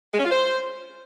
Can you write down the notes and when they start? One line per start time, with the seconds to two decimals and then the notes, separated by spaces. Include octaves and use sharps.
0.13 G#3
0.19 C#4
0.25 F4
0.31 C5